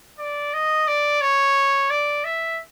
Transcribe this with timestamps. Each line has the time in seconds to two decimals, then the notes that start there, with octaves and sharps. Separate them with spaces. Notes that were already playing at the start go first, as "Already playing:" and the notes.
0.19 D5
0.54 D#5
0.88 D5
1.21 C#5
1.90 D5
2.24 E5